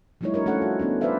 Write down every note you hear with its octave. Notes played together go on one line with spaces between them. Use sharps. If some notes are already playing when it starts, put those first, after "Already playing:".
F3 G3 A3 D#4 E4 C#5
D4 F#4 A#4 C#5
A3 C#4 F4 A4 C#5 F#5
F#4
B3 C#4 D4
D#4 B4 C5 D5 E5 F5